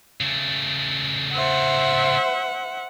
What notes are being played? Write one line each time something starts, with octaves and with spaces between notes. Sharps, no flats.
C#3 A3
C5 E5 F#5